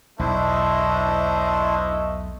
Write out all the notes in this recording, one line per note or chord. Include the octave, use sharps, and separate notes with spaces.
B1 E2 A3 D4 E4 C5 D#5